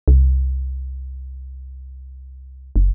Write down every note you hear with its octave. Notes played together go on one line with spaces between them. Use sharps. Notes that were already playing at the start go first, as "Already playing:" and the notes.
C2
F#1